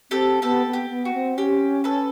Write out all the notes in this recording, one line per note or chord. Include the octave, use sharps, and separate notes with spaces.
C4 G4 A4
B3 G4 A4
B3
G4
B3
F#4
C4
C#4 G4
A4 B4